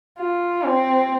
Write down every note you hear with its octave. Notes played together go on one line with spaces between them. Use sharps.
F4
C4